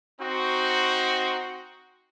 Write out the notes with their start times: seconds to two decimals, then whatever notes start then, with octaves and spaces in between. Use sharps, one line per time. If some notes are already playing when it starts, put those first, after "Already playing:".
0.21 C4 D#4 F#4